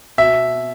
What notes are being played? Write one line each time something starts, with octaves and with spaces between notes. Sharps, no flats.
B2 E5